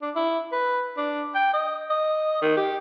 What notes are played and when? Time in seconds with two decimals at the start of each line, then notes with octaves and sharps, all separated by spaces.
0.02 D4
0.15 E4
0.52 B4
0.97 D4
1.35 G5
1.53 D#5
1.90 D#5
2.42 D#3
2.57 G4